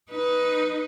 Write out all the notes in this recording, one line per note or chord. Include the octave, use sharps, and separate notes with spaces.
D#4 B4